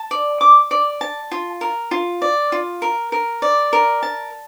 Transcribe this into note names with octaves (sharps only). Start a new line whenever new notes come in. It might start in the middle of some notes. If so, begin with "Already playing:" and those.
Already playing: A5
D5
D6
D5
A5
F4
A#4
F4
D5
F4
A#4
A#4
D5
A#4
A5